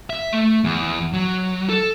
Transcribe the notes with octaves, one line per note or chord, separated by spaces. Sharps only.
E5
A3
E2
F#3
A4